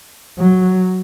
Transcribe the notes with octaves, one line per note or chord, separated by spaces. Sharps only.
F#3